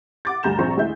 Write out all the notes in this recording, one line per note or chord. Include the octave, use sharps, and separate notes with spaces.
F#5 D6 A6
D2 G2 A#5 G6 E7
A#1 F3 C4 C5 A#5 C#6
D2 G#3 E4 D#5 E5 G6